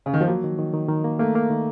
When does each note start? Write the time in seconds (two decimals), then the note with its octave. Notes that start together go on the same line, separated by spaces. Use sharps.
0.06 C#3
0.14 D#3
0.21 F3
0.28 F#3 A#3
0.44 D#3
0.59 D#3
0.73 D#3
0.88 D#3
1.04 A#3
1.19 A3 A#3
1.35 A#3
1.50 D#3